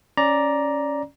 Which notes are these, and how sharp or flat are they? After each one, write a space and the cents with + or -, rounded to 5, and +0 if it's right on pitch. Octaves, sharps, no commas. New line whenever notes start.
C#4 +0 D5 +0 A#5 +10